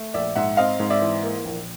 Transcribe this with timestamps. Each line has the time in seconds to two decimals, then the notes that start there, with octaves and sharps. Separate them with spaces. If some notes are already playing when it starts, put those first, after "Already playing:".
Already playing: A3
0.14 A#1 D5 E5
0.36 G#2 E5 F#5
0.57 C4 D#5 F5
0.80 G#2
0.90 D5 E5
1.01 E3
1.23 A#3
1.45 A#1